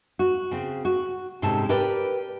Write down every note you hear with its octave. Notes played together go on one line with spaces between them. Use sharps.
F#4
C#3 C4
F#4
G#2 C3 C#4 A4 A5
G4 A#4 B4 D5 G5